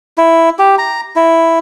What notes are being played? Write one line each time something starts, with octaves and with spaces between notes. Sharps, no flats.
E4
G4
A#5
E4